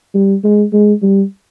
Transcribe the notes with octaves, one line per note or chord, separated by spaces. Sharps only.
G3
G#3
G#3
G3